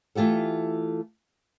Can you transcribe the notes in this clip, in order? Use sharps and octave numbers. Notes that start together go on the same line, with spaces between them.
E3 A3 F4 G4 A4